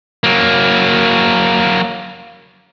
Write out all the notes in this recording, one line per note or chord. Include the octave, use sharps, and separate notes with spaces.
F#3 A#3